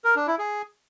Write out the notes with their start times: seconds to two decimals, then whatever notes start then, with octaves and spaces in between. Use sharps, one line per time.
0.04 A#4
0.16 D4
0.27 E4
0.39 G#4